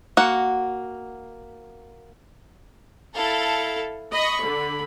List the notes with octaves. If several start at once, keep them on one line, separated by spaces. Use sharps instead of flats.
A#3 F#4 F#5
E4 A4 F5
D#5 B5 C#6
D3